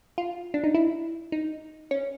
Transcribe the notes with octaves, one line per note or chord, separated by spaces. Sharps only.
F4
D4
D#4
E4
D#4
C#4